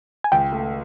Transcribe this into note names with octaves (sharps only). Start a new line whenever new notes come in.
G#5
C#2 G5
A3